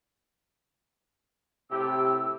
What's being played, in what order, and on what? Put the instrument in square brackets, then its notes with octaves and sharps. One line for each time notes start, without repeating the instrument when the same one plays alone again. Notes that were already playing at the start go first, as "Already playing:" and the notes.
[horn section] A2 C3 G4 [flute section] E6